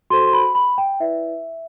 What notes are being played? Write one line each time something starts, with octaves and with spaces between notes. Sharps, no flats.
F#4 A4 C5 C6
C6
B5
B5
G5
E4 B4 D5 E5